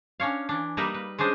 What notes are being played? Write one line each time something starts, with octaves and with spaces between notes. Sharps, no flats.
C#4 D4 C#5 F5
E3 D4
G3 A#3 D#4 A#4 B4 E5
B4
G#3 C#4 D4 C5 D#5